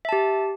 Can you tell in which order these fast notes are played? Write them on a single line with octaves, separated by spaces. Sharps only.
E5 A5 G4